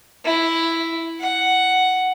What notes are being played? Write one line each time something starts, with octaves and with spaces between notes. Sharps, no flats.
E4
F#5